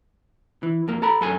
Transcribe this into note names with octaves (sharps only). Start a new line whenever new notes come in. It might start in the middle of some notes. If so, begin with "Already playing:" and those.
E3
F2 A#3
A4 A#5 B5
F#2 A4 G#5